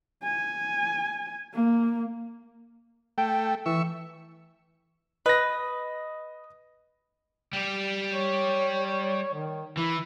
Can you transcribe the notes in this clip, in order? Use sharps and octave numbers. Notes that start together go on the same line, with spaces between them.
G#5
A#3
A3 G5
E3 E5 C#6
B4 D#5 A#6
G3 G4
C#5
D#3
E3 E4